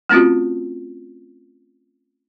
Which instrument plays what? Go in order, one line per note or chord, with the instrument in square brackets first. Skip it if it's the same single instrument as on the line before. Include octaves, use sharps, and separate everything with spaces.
[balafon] A3 C4 C#4 F4 F#4